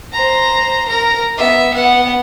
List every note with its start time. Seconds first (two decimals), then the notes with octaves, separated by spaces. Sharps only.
0.12 C5 A#5
0.88 A#4 A#5
1.38 B3 E5
1.73 B3 F#5